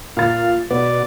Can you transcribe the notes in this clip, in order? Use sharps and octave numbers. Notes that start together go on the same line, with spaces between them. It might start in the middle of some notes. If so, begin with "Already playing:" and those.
A#2 F4 F5 A6
B2 B3 D5